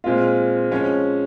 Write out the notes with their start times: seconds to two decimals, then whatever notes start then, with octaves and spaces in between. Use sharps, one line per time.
0.04 A#2 G#3 C4 F4
0.71 F3 G#3 C#4